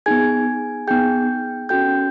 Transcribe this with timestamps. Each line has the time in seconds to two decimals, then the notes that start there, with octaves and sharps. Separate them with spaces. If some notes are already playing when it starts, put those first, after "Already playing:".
0.06 B3 D#4 G#4 G#5 G#6
0.88 B3 D#4 G#4 G5 G6
1.69 C#4 F#4 A4 G5 G6